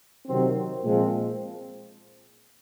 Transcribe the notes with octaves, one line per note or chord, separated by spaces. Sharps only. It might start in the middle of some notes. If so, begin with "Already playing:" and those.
C3 D#3 F#3 C4
A#2 F3 G#3 C4